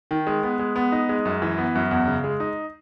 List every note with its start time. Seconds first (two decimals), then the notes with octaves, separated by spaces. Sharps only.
0.11 D#3
0.27 G#3
0.43 B3
0.59 G#3
0.76 B3
0.92 D#4
1.09 G#3
1.25 F#2
1.42 E3
1.58 B3
1.75 F#2
1.91 E2
2.08 C#3
2.24 G#3
2.40 D#4